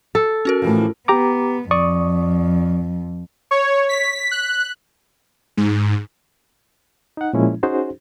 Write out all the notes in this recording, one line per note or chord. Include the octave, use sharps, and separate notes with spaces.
A4
C#4 F#4 A#4
A2 E3 F3
B3 G4 A#5 D6
F2 D5 C#6 D#6
C#5
B6
F#6
G#2
D#4 F#5
A#2 F3 G#3 C#4 E4
C#4 D#4 F#4 G#4 C5